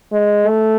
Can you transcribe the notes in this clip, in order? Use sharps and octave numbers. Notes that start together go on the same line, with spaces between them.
G#3
A3